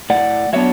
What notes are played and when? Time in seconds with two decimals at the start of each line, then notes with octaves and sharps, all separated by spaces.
0.10 A2 D5 F#5
0.53 F#3 B3 D4 C#5 E5